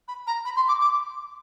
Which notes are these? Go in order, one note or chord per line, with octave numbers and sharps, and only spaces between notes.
B5
A#5
B5
C6
D6
D6